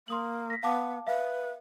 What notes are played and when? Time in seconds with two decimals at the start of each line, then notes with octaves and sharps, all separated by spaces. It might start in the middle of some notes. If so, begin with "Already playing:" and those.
0.08 A#3 C6 D#6 F#7
0.50 A#6 B6
0.63 B3 F5 A5 D6
1.07 B4 E5 F5